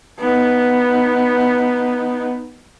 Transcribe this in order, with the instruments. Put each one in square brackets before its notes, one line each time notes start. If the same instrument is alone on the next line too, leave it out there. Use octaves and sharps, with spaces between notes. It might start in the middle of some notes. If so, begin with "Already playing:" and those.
[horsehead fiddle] B3 D#4